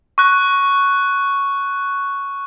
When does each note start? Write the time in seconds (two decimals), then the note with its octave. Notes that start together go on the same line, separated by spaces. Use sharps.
0.18 C#6 F#6